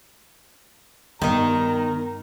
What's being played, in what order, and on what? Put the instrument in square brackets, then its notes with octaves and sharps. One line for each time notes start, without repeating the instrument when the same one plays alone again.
[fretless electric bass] G2 [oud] D#3 D#4 [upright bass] B3 [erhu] A#5